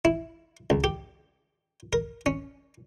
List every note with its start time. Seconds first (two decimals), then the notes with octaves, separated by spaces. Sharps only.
0.05 E4
0.70 C#2
0.84 G4
1.93 A#4
2.26 C#4